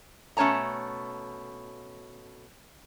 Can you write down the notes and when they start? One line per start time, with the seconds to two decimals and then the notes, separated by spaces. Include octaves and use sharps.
0.37 B2 A3 C#4 C#5 A5 A#5